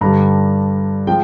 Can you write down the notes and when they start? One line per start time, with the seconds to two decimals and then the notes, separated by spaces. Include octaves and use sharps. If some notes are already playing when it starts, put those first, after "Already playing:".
0.01 G2 D3 G3 A#5
1.07 F3 G#3 G5